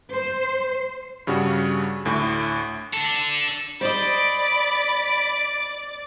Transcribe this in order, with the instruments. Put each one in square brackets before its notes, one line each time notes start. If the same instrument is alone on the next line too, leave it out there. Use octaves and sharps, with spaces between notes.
[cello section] C5
[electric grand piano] G2 C#3 G3 F#4
D2 A2
[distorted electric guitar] D4 A4
[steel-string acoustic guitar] C5 D#5 [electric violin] D5 [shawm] B5 [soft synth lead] D7